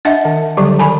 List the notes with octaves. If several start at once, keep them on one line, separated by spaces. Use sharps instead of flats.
D4 D#5 E5 F#5
D#3
D3 F#3 G3 G4
D#3 G#5 B5